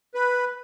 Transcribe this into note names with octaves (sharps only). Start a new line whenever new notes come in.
B4